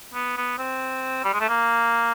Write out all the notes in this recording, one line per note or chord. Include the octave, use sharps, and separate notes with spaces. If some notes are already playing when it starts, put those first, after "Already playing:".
B3
B3
C4
G3
G#3
A3
A#3